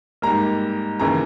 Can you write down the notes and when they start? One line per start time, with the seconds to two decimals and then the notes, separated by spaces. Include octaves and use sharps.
0.22 G#2 G3 A#3 A#5
0.99 D#2 C#3 E3 A#3 A#5